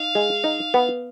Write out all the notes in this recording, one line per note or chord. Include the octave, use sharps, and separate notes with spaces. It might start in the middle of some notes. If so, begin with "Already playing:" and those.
Already playing: D#4 F5
G#3
D#4
B3